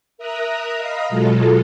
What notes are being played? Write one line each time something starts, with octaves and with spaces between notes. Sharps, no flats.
A#4 E5 A#5 D#6 F#6
D#5 F5 A#5 B5 D#6
B2 F#3 G#3 F4 A4